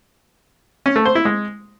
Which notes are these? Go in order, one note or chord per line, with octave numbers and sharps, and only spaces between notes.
C#4
A3
C5
E4
G#3